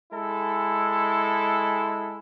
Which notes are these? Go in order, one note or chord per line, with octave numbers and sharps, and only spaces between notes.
G#3 E4 A4